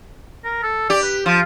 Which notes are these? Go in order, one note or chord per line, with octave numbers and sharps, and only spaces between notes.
A#4
A4
G4 D5
B4
F3 F4